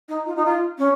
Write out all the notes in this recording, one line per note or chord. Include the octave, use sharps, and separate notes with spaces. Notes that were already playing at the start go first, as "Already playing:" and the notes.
D#4
F4
D#4
F4
C#4